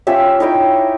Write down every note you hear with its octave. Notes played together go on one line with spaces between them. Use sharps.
C#4 F4 G4 E5
D#4 E4 C#5 G5